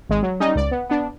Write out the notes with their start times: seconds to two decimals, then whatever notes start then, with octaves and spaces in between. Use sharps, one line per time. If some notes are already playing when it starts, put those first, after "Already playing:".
0.09 G#1 G#3
0.23 F#3
0.40 G3 C#4 D#4 D#5
0.55 C#2 D5
0.71 B3
0.89 B3 D4